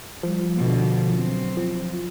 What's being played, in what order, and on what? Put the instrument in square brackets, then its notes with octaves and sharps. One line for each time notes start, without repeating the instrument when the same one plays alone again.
[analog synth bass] F3 [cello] G3
[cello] B2 D3
F#3 C4
[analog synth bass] F3